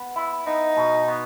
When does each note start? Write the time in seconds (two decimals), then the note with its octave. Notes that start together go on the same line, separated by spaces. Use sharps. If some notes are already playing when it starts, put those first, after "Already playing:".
Already playing: B3
0.16 E4
0.47 B3 D#4
0.77 B2
1.08 B3